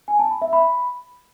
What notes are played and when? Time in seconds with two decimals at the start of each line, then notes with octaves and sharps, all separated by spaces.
0.08 G#5
0.19 A5
0.30 B5
0.42 E5
0.53 B5